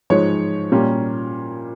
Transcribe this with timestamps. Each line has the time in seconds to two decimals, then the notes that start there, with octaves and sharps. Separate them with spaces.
0.10 G#2 F3 G#3 C#5
0.72 A#2 G3 A#3 C#4